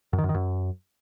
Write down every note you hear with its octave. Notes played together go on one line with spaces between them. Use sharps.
F#2
D#3
F#2
D#3
F#2